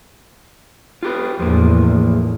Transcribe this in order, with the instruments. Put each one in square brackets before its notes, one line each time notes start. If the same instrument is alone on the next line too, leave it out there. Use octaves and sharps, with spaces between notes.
[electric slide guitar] F4 G4 B4
[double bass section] E2 A2 [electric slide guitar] F3 A#3